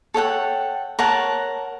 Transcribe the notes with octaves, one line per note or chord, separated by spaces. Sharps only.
A4 C#5 F#5 G5
A#4 C#5 F#5 A5